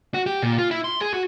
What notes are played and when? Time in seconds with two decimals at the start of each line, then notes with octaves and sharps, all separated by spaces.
0.14 F#4
0.26 G4
0.43 A#2
0.58 F4
0.71 E4
0.84 C6
1.01 G#4
1.14 F#4